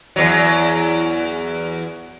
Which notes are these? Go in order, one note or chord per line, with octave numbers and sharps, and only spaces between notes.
E2 F#3